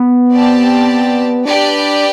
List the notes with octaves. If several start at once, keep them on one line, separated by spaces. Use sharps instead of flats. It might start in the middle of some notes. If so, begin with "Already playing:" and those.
Already playing: B3
C4 G4 D5 A5
D4 G4 B4 D5